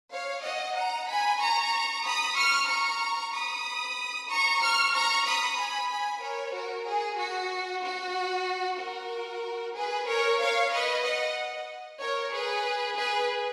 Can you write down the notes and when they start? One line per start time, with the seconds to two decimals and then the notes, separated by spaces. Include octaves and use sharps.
0.12 C#5 F5
0.43 D#5 F#5
0.76 F#5 A#5
1.08 G#5 B5
1.40 A#5 C#6
2.04 B5 D#6
2.37 C#6 F6
2.68 A#5 C#6
3.33 B5 D#6
4.29 A#5 C#6
4.61 C#6 F6
4.93 A#5 C#6
5.25 B5 D#6
5.57 G#5 B5
5.90 G#5 B5
6.22 A#4 C#5
6.54 F#4 A#4
6.86 G#4
7.19 F#4
7.83 F#4
8.79 F#4 A#4
9.75 G#4 B4
10.07 A#4 C#5
10.40 C#5 F5
10.72 B4 D#5
11.04 D#5 F#5
12.00 A#4 C#5
12.32 G#4 B4
12.97 G#4 B4